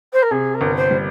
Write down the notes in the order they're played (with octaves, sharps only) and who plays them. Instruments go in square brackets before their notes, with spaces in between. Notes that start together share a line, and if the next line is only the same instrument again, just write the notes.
[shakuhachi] C5
A#4
[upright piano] C3 [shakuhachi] G#4
[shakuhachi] A#4
[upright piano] G1
[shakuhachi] C5
[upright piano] G3